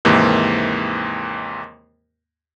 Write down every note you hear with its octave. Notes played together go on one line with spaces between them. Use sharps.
D#2 G#2 C3 E3 A#3